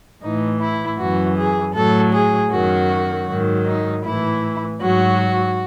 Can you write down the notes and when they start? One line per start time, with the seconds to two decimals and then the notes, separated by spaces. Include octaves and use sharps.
0.21 A2 E3 D#4
0.60 E4
0.98 F#2 E3 F#4
1.37 G#4
1.74 A2 F#3 A4
2.13 G#4
2.51 F#2 D#3 F#3 F#4
3.27 G#2 D#3 F#3
3.66 D#4
4.04 A2 E3 E4
4.80 G#2 F#3 F#4